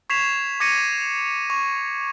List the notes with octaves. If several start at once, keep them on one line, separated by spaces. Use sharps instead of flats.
C#6 G#6 B6 C7 E7 F7
C#6 D6 G#6 A#6 C#7 D#7
C#6